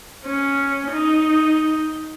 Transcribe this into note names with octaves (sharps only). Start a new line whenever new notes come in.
C#4
D#4